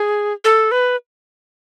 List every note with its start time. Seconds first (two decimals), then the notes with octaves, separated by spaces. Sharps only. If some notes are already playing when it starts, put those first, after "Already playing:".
Already playing: G#4
0.45 A4
0.71 B4